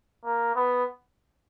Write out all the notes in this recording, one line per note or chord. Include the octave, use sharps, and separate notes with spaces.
A#3
B3